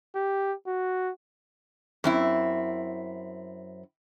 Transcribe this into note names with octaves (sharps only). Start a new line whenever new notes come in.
G4
F#4
F#2 C4 E4